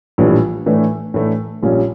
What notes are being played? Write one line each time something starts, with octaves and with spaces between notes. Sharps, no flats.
A#1 A2 E3 G3 D4
A2 E3 A3 D4
A2 E3 A3 D4
A#1 A#2 G3 C#4